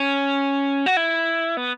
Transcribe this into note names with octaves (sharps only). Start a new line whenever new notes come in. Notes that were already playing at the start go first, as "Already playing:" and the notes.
Already playing: C#4
F#4
E4
B3